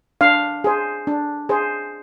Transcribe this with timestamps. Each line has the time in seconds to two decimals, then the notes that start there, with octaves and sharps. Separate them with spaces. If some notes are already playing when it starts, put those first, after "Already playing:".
0.21 D4 F5
0.64 G#4 C5
1.07 D4
1.49 G#4 C5